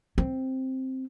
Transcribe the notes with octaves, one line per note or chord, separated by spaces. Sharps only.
C4